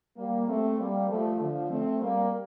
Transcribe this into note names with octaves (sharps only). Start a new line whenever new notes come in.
G3 A#3
A3 C4
G3 A#3
F3 A3
D3 F3
A3 C4
G3 A#3